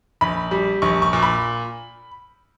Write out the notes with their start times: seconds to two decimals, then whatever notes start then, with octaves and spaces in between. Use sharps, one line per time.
0.21 A#1 B5
0.51 G3
0.82 A#1 C#6
1.02 C#6
1.13 A#2
1.23 B5